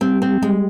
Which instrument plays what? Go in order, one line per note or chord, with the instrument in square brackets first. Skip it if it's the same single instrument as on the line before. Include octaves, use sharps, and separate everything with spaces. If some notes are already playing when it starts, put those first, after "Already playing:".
[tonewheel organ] G3 [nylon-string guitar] C4
[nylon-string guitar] C4
[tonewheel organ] G3 [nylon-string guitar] G#3